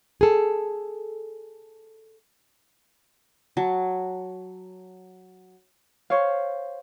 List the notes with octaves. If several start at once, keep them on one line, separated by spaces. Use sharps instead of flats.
G#4 A4
F#3 A5
C5 C#5 F5